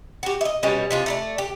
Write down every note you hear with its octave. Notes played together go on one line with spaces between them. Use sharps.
F#4 G4
D#5 E5
B2 G3 G#3 C#4
C3 G#3 F4
A3 A#4 D5
G4